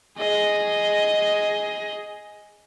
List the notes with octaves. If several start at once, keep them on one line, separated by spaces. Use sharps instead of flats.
G#4 D#5